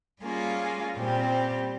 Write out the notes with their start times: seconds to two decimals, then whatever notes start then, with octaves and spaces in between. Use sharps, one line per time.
0.23 G3 A#3 C#4 F4 G#4
0.96 A#2 G3 C4 G4